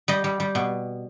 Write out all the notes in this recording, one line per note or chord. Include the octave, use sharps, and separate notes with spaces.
G3 D#5
G3
G3
B2